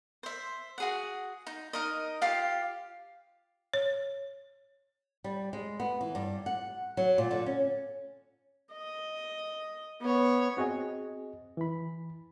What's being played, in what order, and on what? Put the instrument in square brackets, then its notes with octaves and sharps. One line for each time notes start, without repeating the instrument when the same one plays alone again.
[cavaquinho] C5 E5
F#4 G#4 F#5
D#4
D#4 A#4 D#5
F4 G4 F5
[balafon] C#5
[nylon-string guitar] G3
G#3
B3
E3
G2
F#5
F#3
A#2
D3
C#4
[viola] D#5
B3 C#5
[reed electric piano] C4 F#4 G#4 D#5 G#5
E3 B5